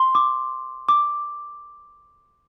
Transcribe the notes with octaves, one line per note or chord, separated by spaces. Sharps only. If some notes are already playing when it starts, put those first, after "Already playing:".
Already playing: C6
D6
D6